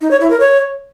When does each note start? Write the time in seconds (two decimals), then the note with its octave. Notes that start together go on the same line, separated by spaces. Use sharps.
0.01 D#4
0.11 C#5
0.21 E4
0.30 A#4
0.40 C#5